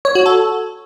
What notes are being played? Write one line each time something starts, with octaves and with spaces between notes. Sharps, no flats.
C#5
F#4
A4